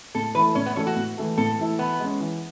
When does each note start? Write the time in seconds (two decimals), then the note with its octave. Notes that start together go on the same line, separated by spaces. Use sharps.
0.15 A2 A4
0.35 E3 A3 E4 A4 B4
0.55 A2 C#4
0.66 B3
0.76 E3 A3 C#4 E4 A4
0.87 F#4
0.96 A2
1.17 E3 A3 E4 A4
1.38 A2 A4
1.58 E3 A3 E4 A4
1.79 E3 B3
1.99 G#3 C#4
2.20 E3